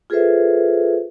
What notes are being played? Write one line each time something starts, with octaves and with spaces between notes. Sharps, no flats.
F4 G#4 A4 B4 C5 E5